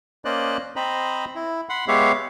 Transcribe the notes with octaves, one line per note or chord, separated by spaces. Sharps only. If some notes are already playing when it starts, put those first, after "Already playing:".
A#3 C#4 C5 D5 D#5 F#6
C4 C5 D#5 A#5 B5
E4
F#5 B5 C6
G#3 B3 G4 C#5 E5 F5